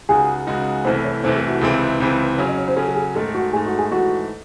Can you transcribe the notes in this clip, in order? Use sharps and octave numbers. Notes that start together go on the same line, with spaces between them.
C#2 C#3 G#3 D#4 F#4 G#4
C#2 C#3 G#3 D#4 F#4
C2 C3 E3 A3 C5
C#5
C2 C3 E3 A3 C5
A4
F#4
C#2 C3 E3 C4 G#4
C#2 C3 E3 C4
C#3 F#3 C#4 C#5
D#5
C#5
C5
C#3 F#3 C#4 A4
A4
G#4
G#2 D#3 A3 A4
F#4
G#2 D#3 A3 G#4
F#4
G#4
G#2 E3 A3 F#4